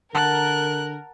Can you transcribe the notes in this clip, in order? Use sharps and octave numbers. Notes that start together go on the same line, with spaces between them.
D3 A#4 F#5 A5 F#6